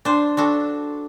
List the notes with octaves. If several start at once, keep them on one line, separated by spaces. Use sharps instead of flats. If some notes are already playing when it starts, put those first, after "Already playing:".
D4 C5
D4 F#4 A4